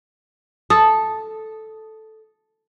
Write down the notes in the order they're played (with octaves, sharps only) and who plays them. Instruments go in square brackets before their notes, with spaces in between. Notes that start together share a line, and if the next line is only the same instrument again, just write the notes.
[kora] A4 [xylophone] D#6